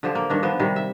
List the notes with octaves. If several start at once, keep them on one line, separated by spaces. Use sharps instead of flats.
D3 F3 G4 C5
A#3
G2 D#3 D4
F3 B3 C5
C3 D#3 G3
E5